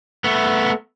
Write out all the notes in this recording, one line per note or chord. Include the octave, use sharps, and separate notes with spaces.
A3 B3